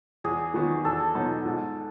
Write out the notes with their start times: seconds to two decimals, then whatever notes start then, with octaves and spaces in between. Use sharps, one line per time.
0.24 E2 G#4
0.54 D#3 F#3 B3 F#4
0.85 E2 A4
1.15 B2 F#3 B3 D#4
1.45 G#2